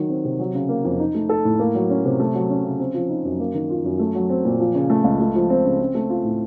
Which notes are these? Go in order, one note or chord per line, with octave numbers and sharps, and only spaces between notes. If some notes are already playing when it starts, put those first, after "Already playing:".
Already playing: D#3 F#3
C4
C3
F#3
C#3
A#3
F2
D#4
A3
A4
A2
A#3
F#3
C#4
C3
A3
F#3
C#4
C#3
C4
F3
D#4
F#2
A#3
D#3
F4
F#2
A3
F#3
C4
A#2
F3
C#3
A3
C#2
A3
F3
C4
C#3
C4
A3
F4
A2